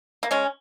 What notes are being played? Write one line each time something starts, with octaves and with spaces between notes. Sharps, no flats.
A#3
G#3 C#4